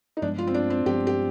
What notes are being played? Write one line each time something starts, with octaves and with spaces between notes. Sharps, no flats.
D#4
G2 F3 G#3 B3 D4
F4
C4
D4
C4
G2 F3 G#3 B3 G4
G4